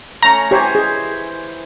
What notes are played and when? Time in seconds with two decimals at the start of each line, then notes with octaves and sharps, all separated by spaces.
0.23 A3 C#4 A#5 C#6
0.51 E3 G4 C5 C#5 G#5
0.75 G#4